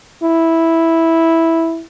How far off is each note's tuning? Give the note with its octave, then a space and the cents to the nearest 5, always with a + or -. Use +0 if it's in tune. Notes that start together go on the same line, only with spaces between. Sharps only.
E4 -5